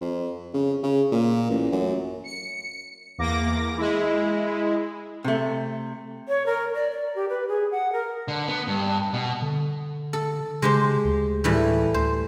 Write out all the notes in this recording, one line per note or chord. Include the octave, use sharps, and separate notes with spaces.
F2
C#3
C#3
A#2
A1
F#2
C#7
E2 A#3 D6 A#6
G#3 E4
C3 A3
C#5
A#4
D5
D5
G4
B4
G#4
F#5
A#4
D3
B3
G2
B2
D3
A4
C#3 G#3 G4 C5
D2
A2 E3 G3
D2 C5